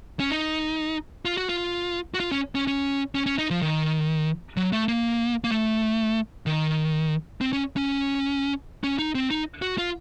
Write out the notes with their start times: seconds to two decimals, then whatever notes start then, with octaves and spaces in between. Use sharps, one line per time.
0.20 C#4
0.30 D#4
1.25 F4
1.37 F#4
1.49 F4
2.14 F#4
2.20 F4
2.32 C#4
2.55 C#4
2.67 C#4
3.15 C#4
3.26 C#4
3.38 D#4
3.50 F3
3.62 D#3
4.57 F#3
4.73 A3
4.88 A#3
5.44 A#3
5.51 A3
6.46 D#3
7.41 C4
7.53 C#4
7.77 C#4
8.84 C#4
8.99 D#4
9.15 C4
9.31 D#4
9.62 F#4
9.78 F4